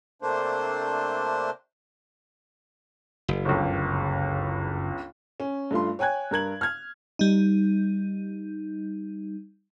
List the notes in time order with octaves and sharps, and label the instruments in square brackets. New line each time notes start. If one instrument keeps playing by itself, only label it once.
[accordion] C3 A3 A#3 D4 C5
[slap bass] F#1
[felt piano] G1 C#2
[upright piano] C#4
G2 A3 F4 C6
C#5 G5 G#5 F#6 G#6
G2 A#4 G#6 F#7
F6 G#6
[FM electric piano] G3 D#4